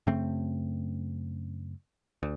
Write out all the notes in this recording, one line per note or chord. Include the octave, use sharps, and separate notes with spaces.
F#2 C#3 A3 C4
D2